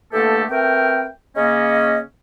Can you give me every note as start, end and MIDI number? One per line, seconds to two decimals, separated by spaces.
0.12 0.44 50
0.12 0.44 52
0.12 0.44 57
0.12 0.44 58
0.12 0.44 67
0.12 0.44 69
0.50 1.07 57
0.50 1.07 59
0.50 1.07 60
0.50 1.07 70
0.50 1.07 79
1.36 1.99 49
1.36 1.99 58
1.36 1.99 61
1.36 1.99 75